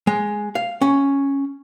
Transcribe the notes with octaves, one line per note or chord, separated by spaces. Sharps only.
G#3
F5
C#4